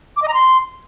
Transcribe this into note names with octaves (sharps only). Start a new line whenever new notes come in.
D6
D#5
A#5
C6